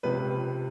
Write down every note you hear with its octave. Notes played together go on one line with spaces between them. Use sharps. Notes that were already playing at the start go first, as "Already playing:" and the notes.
C#2 C3 F3 B4